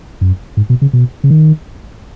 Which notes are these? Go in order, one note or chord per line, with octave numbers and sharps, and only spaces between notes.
F#2
G#2
B2
C#3
B2
C#3
D#3